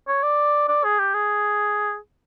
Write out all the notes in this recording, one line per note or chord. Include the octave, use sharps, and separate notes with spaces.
C#5
D5
D5
G#4
G4
G#4